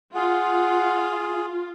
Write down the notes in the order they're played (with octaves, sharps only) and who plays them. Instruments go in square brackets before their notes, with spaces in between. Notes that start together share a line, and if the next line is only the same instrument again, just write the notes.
[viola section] F4 [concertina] G#4 [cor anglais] F#5